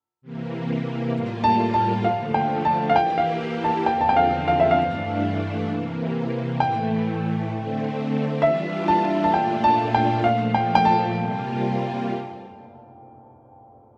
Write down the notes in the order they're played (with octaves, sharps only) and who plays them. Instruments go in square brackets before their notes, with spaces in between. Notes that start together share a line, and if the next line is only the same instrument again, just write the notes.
[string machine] C3 E3 A#3
A2 G3 A#3 F4
[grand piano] A5
A5
[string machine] D3 F3 A3 [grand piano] F5
[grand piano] G5
A5
F5
[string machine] E3 A#3 E4 G4 [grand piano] G5
[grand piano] F5
A5
[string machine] E2 D3 F3 C4 [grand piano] G5
[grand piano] A5
G5
F5
F5
E5
F5
[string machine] G2 E3 A3 D4
C3 E3 A#3
[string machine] A2 E3 A3 [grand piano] G5
[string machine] D3 A3 C4
[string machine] E3 G3 D4 F4 [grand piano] E5
[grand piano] A5
A5
[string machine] A#2 A3 D4 F4 [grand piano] G5
[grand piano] A5
G5
[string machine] A#2 F3 A3 [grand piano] F5
[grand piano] G5
G5
A5
[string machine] C3 G3 A#3 F4